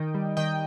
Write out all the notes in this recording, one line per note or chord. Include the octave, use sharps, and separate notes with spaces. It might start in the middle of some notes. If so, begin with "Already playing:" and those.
Already playing: D#3 D#4 D#5 G5
G3
D#3 D#5 G5